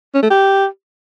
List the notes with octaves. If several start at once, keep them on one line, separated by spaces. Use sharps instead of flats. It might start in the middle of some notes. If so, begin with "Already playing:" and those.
C#4
A3
G4